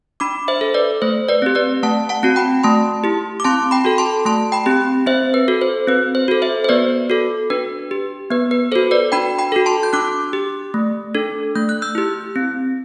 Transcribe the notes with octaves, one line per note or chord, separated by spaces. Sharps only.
D4 B5 D6
C5 E5
A4
B4 D5
A3 C5
B4 D5
C4 G4
B4 D5
A3 F#5 A5
F#5 A5
C4 F#4
G5 B5
A3 A5 C6
E4 G4
D6
C4 A5 C6
G5 B5
F#4 A4
A5 C6
A3 A5 C6
G5 B5
C4 G4
C4 C5 E5
B4
F#4 A4
C5
C4 B4
C5
F#4 A4
C5 E5
C5
B3 B4 D5
F#4 A4
D4 B4
G4
B3 B4
B4
F#4 A4 C5
B4 D5
D4 G5 B5
G5 B5
F#4 A4
A5 C6
G6
D4 D6 F#6
G4
A3
D4 A4
A3 G6
F#6
E6 G6
E4 G4
C4